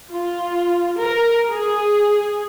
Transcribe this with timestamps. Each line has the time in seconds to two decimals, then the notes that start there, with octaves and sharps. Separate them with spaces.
0.10 F4
1.01 A#4
1.52 G#4